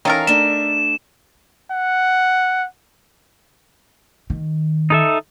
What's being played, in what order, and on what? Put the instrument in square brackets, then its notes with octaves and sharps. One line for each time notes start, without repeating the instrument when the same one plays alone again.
[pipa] D#3 A4 A#4 [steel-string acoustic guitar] E3 C#4 F5
[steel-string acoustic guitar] A3 D4 [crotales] E7
[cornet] F#5
[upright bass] D#3
[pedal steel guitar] D#4 A4 E5